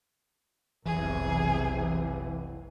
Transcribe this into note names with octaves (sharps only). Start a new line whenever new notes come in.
F1 B1 C3 E3 G#4